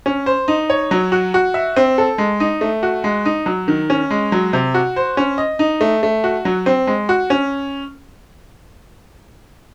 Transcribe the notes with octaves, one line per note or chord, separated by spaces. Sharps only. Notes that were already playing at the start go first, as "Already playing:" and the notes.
C#4
C5
D#4
C#5
F#3
F#4
F#4
E5
C4
A4
G#3
D#4
A3
F#4
G#3
D#4
F#3
D#3
C#4
G#3
F#3
C3
F#4
C5
C#4
D#5
D#4
A3
A3
F#4
F#3
C4
G#3
F#4
C#4